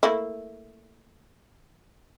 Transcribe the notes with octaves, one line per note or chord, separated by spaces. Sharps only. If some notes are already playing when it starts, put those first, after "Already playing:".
A3 A#3 E4